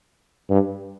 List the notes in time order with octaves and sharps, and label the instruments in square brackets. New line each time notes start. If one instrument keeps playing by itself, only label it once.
[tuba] G2